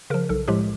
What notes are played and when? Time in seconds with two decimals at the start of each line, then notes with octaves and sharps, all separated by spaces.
0.10 C#3 F3 A#4
0.29 B1 A4
0.48 A2 F3 G#3 G4